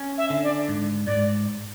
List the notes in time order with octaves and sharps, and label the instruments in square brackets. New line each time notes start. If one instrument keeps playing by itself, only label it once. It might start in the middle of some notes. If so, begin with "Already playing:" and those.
Already playing: [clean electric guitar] C#4
[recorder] E5
[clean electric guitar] D3
[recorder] D5
[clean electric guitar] G#2
[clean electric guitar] G#2 [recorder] D5